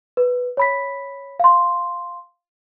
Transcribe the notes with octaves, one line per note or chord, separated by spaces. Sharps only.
B4
C#5 B5 B6
F5 C6